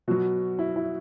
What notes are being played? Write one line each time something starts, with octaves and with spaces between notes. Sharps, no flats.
B2 F#3 F#4
E4
E4